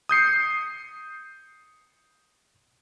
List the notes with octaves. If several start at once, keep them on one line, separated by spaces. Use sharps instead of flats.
D#6 G6 C7 C#7